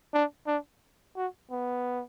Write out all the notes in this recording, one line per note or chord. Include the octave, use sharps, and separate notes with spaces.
D4
D4
F#4
B3